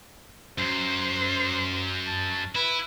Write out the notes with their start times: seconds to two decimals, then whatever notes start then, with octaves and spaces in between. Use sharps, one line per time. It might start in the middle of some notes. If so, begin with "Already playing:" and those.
0.58 F#2 C5
2.07 A5
2.55 E4 B4